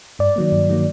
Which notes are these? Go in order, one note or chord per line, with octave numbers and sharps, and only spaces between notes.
G2 D5
D#3 F#3 A#3
G2
D#3 F#3 A#3